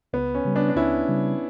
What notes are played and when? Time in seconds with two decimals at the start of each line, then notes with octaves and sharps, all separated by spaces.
0.13 C#2 B3
0.35 C#4
0.45 C#3 G3
0.56 B3 D4
0.69 D4
0.76 C#2 C#4 E4
1.08 C#3 G3